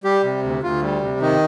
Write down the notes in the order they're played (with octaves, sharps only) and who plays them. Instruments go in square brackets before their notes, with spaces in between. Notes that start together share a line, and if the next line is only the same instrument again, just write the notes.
[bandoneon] G3 G4
C3
D2
D2 F4
G3
C3
D#3 D#4